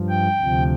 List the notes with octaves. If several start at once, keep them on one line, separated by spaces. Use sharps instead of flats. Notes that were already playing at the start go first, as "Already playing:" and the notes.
Already playing: G2 F3
G5
D2 C3 F3